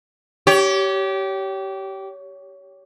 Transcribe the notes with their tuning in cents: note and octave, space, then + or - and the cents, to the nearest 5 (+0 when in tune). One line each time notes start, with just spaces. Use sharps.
G4 -20 C#5 +20